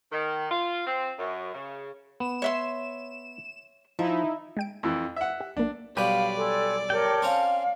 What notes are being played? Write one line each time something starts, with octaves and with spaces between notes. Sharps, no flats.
D#3
F4
C4
F#2
C#3
B3 E7
C#5 E5 C6
F3 D#4 E4 E5
G#3 G5 D7
F2 E3
E5 F#5
G4
B1 A#3 D4
B1 G3 G4 B4 D5 F5 B5
A4 G#5 C6
G4 A4 A#4 C#5 G5
C4 C#4 F5 A#5